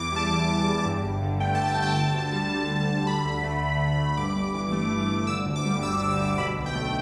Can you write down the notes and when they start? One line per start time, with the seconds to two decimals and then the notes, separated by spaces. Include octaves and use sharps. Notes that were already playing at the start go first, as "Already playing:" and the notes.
Already playing: E2 E3 D6
0.12 G3 A5
0.30 E2
0.48 E3
0.67 E2
0.85 G2
1.04 G1
1.22 D3
1.40 A3 G5
1.55 A5
1.59 G2
1.68 A5
1.78 G1 G5
1.96 D3 A5
2.14 D2
2.32 G3
2.51 D2
2.69 D3
2.89 D2
3.06 D3 B5
3.25 D2
3.43 A3
3.62 D2
3.80 D3
3.99 D2
4.17 G2 D6
4.36 G1
4.54 E3
4.72 A3
4.91 G2
5.09 G1
5.27 D3 E6
5.46 D2
5.56 D6
5.65 G3
5.83 D2 E6
6.01 D3
6.11 D6
6.20 D2
6.38 B2 B5
6.57 B1
6.66 G5
6.75 A3